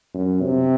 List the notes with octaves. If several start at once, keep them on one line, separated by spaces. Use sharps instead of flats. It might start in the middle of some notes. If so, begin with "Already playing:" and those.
F#2
C3